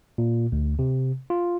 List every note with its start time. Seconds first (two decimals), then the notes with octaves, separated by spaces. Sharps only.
0.18 A#2
0.52 D2
0.79 C3
1.30 F4